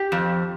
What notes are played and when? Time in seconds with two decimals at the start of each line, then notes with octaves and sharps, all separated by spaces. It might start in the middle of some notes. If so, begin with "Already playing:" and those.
Already playing: G4
0.12 F2